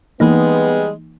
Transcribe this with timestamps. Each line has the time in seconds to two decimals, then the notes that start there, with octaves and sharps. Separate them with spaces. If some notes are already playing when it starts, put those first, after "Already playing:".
0.20 E3 G3 G#3 A#3 B3 D#4